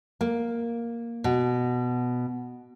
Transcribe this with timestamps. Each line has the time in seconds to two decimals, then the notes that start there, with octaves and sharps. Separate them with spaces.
0.21 A#3
1.24 B2